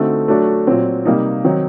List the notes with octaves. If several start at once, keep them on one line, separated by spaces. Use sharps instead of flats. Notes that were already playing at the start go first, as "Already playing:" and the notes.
Already playing: D3 A3 C4 D#4 F#4
F#3 A3 D4 F#4
A#2 F#3 C4
C3 G3 A#3 D#4
D#3 F#3 C4 D#4